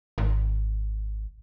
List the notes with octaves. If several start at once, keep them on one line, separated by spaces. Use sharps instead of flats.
G#1